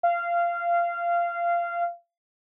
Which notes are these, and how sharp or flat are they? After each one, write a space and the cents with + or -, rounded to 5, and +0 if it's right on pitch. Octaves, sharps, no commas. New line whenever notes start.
F5 -20